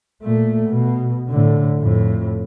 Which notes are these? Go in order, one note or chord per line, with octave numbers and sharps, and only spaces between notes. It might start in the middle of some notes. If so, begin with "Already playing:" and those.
A#2 A3
B2
A2 D3
F2 A2